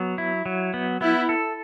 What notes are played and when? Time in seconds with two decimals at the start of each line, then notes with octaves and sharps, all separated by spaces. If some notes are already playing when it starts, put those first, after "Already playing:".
Already playing: F#3 B3
0.18 E4
0.46 F#3
0.74 B3
1.01 B3 E4
1.29 A4